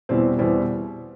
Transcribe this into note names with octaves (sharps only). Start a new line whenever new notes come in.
E2 B2 G3 C4 E4
E2 B2 G3 C4 E4